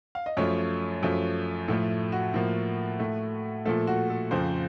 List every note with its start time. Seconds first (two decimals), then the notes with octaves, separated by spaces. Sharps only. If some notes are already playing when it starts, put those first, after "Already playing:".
0.15 F5
0.26 D#5
0.37 F#2 F3 A3 C#5
1.03 F#2 F3 A3
1.68 A2 F3 A3 A4
2.12 F#4
2.34 A2 F3 A#3
2.99 A2 A3
3.65 A#2 F3 A3 A4
3.87 F#4
4.10 A4
4.31 F2 C#3 F3 C5